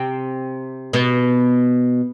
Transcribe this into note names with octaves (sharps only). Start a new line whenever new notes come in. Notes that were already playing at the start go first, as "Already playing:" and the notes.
Already playing: C3 C4
B2 B3